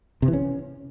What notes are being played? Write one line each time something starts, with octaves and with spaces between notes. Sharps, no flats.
C3
E3
C#4